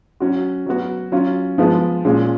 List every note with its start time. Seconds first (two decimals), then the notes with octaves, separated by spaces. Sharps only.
0.20 F#3 C#4 F#4
0.66 F#3 B3 F#4
1.12 F#3 C#4 F4
1.58 F3 G#3 B3 F4
2.05 A#2 G#3 C#4 F4